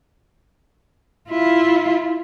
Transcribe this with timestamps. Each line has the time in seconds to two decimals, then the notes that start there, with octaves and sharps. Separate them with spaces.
1.30 E4 F4